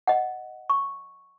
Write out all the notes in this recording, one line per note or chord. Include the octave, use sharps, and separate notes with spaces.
D#5 F#5
C#6